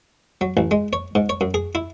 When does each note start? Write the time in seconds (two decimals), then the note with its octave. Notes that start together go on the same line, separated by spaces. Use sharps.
0.41 F#3
0.57 A1
0.71 G#3
0.93 C#5
1.15 G#2
1.29 C#5
1.41 F#2
1.54 G#4
1.75 E4